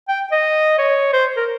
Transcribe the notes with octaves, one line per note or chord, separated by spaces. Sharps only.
G5
D#5
C#5
C5
A#4